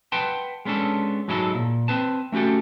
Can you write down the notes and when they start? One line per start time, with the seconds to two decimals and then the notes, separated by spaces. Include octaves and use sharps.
0.12 B4 F#5 G5 A5 C6
0.65 G#3 B3 C#4 D4 A4
1.28 G#2 F#3 G#3 E4 G4 A4
1.55 A#2
1.88 C4 B4 A5
2.32 A3 C#4 F#4 G4 A4